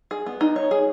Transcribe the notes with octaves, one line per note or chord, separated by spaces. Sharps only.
G#4
B3
D#4
C#5
G#4